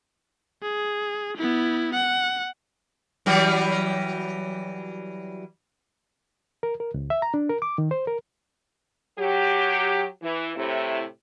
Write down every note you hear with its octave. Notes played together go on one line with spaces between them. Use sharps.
G#4
B3 E4
F#5
E3 F#3 G3
A#4
A#4
C#2
E5
A#5
D4
A#4
D6
D#3
C5
A#4
F#3 G4
E3
A2 C3 E4